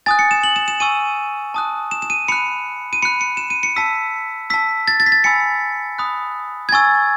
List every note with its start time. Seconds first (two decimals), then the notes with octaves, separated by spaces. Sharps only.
0.06 G#5 D#6 F#6 A6
0.19 C#7
0.31 E7
0.43 F#7
0.56 E7
0.68 E7
0.80 G#5 C#6 E6 D#7
1.54 A5 D#6 F#6
1.91 E7
2.02 E7
2.10 D#7
2.28 B5 F#6 C#7
2.93 D#7
3.02 B5 F#6 C#7
3.21 C#7
3.37 E7
3.50 D#7
3.63 C#7
3.76 A5 E6 B6
4.50 A5 E6 B6
4.88 A6
5.00 A6
5.06 B6
5.12 A6
5.24 G#5 B5 E6 C#7
5.99 B5 D#6 F#6
6.69 G#6
6.72 G#5 C#6 E6 A6